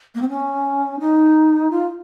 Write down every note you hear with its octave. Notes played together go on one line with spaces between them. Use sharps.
A#3
C4
C#4
D#4
F4